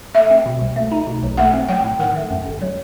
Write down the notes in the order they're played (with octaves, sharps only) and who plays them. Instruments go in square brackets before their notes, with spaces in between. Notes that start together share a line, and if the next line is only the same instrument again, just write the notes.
[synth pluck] A3 [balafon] E5
[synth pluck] C4
B2
C2
A3
D#4
B2
B1
[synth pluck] A3 [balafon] F#5
[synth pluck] C4
[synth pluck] F#3 [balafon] G5
[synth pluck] A2
[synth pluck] D#3 [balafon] F#5
[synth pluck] A3
F#2
G1
F#3